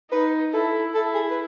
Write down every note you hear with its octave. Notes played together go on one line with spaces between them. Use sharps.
D#4 B4
E4 A4
E4 A4
G#4
B4